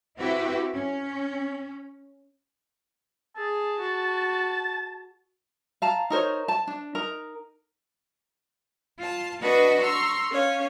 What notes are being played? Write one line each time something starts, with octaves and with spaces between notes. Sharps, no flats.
C4 E4 F#4 G4 B4
C#4
G#4 A5
F#4
F5 A5 A#5
D#4 A#4 C5 C#5
A5
D4
D#4 A#4 A#5
F4 A5
D4 F#4 B4 D#5 F#5 C#6
A#5 C6 C#6 E6
C#4 C#5 F5